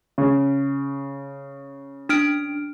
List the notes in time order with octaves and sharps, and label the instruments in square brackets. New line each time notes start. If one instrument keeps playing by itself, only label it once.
[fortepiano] C#3
[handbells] D4 F6 D7